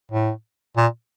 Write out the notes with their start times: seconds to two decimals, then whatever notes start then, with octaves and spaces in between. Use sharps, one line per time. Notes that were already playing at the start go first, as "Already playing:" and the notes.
0.12 A2
0.77 A#2